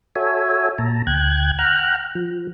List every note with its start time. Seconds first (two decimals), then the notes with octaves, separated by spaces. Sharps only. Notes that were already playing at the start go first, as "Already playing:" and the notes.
0.16 F#4 A4 C#5 E5 G#5
0.78 A#2 A5 A#5
1.07 D2 G5 F#6 G#6
1.59 F#5 G5 A#5 F6 F#6
2.15 F3